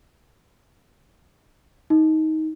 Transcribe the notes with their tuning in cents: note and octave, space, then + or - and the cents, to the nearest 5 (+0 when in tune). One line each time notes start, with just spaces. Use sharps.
D#4 +20